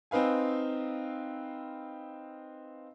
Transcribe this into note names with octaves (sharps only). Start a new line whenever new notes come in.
C4 D#4 B4 F5 G#5